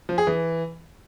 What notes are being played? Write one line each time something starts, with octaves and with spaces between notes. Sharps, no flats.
F3
G#4
E3